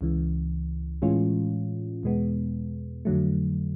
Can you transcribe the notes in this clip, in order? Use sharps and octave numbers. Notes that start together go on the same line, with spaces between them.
C#2 C#3 E3
A2 E3 G#3 C#4 F4
E2 B2 G#3 B3
F2 D3 F#3 A3